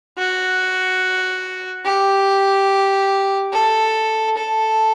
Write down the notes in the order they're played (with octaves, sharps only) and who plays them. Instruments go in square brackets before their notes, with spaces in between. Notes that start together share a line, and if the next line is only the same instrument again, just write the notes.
[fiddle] F#4
G4
A4
A4